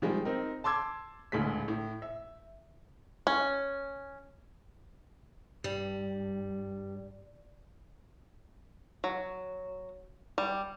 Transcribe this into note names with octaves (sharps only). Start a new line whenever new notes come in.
D#3 F3 G3 G#3
C4 D#4 A#4
A5 C6 D6 E6 G#6
D#1 D2 A2 G#3 B6
A2
E5
C#4
G2 G3
F#3
G3